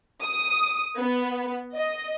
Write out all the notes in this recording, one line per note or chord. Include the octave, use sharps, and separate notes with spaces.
D#6
B3
D#5